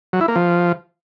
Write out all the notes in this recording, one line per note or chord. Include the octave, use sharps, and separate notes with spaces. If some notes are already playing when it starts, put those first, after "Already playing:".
F#3
E4
A#3
F3